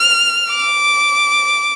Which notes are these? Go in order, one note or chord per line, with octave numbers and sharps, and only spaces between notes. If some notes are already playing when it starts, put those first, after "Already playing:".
Already playing: F6
D6